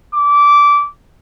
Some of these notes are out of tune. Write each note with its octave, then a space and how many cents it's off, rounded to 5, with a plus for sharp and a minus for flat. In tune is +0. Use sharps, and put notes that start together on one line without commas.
D6 -20